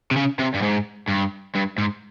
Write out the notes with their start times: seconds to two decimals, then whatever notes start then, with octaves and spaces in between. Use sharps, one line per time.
0.11 C3
0.16 C#3
0.39 C3
0.55 G2
0.63 G#2
1.09 G2
1.55 G2
1.78 G#2